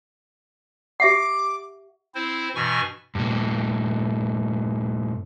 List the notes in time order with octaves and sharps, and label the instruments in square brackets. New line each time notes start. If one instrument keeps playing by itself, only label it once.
[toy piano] G4 E5 F#5 [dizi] D6
[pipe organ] C4 E4 C5
G2 B2 E3 G#5 C#6
[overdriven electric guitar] G2 A#2